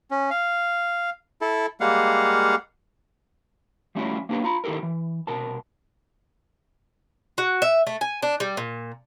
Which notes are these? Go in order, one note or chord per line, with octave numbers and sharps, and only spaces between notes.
C#4
F5
E4 A4
G3 G#3 A#3 F5 F#5
F3 G3 A3 C#4 E4 F#4
A#3 B3 D4 G4 A#4 B4
F4 A#5 B5
D#3 E4 G4 A4 A#4
E3
C2 B2 A#4 A5
F#4
E5
A3
G#5
D4
G3
A#2